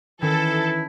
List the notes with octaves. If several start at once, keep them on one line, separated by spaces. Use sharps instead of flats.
D#3 E3 C#4 E4 A4 C#5